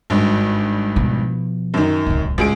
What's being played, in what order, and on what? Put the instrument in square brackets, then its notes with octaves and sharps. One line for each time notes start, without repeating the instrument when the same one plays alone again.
[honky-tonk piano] G#1 G2
[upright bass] B2 F3
[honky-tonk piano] F#2 D#3
[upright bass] D1 C2
[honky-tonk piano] C#2 G#4 D7 [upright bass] A2